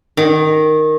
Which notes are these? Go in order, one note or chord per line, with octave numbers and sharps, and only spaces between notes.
D#3